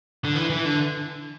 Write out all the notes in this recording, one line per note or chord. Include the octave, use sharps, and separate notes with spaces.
D3
E3
E3
D3